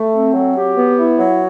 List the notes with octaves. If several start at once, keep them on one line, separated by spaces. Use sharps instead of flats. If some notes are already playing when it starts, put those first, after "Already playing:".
Already playing: A3
C4
F#3
G4
B3
E4
F#3